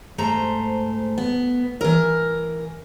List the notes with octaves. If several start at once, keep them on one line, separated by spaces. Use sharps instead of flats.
G#2 A3 C5 A#5
B3
E3 A#4